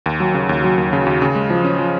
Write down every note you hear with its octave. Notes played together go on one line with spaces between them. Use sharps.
D#2
F#3
C#3
D#2
F#3
D#2
C#3
D#2
C#3
G#3
F3
C#4
F3